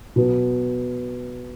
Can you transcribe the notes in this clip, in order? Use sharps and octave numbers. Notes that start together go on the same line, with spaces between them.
B2 F#3 B3